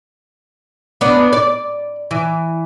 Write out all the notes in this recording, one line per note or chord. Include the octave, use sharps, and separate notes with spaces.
B3 D4
D5
E3